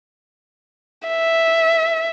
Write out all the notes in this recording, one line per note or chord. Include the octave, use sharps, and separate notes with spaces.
E5